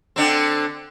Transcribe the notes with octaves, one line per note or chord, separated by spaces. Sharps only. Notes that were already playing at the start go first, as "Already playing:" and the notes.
D3 C4